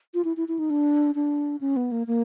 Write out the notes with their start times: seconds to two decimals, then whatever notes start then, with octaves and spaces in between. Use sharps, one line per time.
0.14 F4
0.24 E4
0.37 E4
0.48 E4
0.59 D#4
0.70 D4
1.15 D4
1.61 C#4
1.76 B3
1.92 A#3
2.07 A#3